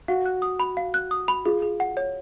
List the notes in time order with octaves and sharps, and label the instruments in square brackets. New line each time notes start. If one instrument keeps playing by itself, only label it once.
[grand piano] F#4 [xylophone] F5
[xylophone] F#6
D#6
B5
F5
F#6
D#6
B5
[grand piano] F4 [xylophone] G#4
[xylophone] G#4
F#5
C#5